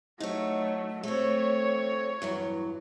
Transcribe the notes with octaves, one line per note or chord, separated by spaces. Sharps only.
F#3 A3 D#4 C#5
A3 C4 C#5
E2 G2 F#3